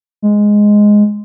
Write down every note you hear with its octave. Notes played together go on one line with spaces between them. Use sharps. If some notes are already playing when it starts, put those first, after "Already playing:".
G#3